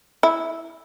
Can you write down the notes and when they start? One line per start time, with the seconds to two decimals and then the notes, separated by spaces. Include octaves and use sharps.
0.23 E4